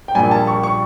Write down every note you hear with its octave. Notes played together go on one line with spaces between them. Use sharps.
G5
A#1 A#2 G3 G#5
A5
C#6
C#6